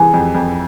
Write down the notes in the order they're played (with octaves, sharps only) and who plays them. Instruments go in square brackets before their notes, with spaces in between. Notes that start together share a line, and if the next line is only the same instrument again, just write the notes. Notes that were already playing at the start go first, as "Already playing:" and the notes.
Already playing: [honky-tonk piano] C3 E3 [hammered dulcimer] G#4
[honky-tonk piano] F2
F2